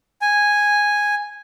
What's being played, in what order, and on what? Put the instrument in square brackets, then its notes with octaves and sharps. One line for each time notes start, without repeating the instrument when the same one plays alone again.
[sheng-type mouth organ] G#5